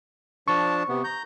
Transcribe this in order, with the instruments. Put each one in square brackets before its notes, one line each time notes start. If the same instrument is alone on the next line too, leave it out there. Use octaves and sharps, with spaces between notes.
[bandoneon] F3 D4 A5 [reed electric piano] C#6
[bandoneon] C3 B3
A#5 G6